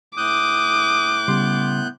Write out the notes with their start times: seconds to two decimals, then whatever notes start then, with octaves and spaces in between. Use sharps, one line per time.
0.17 A2 D6 D#6 F#6 G6
1.28 C#3 G3 B3 C6